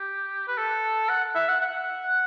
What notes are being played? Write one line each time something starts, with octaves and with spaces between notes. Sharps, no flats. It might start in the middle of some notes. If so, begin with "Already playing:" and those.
Already playing: G4
B4
A4
F#5
E5
F#5
F#5